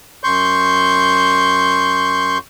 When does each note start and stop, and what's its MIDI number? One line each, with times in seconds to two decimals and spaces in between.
0.24 2.38 42
0.24 2.38 84
0.24 2.38 85
0.24 2.38 91